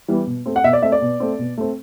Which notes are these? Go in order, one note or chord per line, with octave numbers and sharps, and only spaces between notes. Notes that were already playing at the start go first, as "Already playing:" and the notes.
E3 G3 B3
B2
A3 C4
F#5
B2 E5
D5
A3 C4 E5
D5
B2
A3 C4
B2
A3 C4